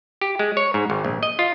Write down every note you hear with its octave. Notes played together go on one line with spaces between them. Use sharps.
G4
G#3
C#5
G#2
G#1
A#1
D#5
F4